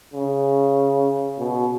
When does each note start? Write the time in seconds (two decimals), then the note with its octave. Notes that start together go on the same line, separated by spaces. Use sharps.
0.13 C#3
1.39 B2